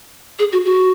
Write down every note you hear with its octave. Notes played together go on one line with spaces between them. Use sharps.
G#4
F#4
F#4